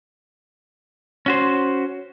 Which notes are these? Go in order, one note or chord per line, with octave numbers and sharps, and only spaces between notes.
C#4 F#4 C5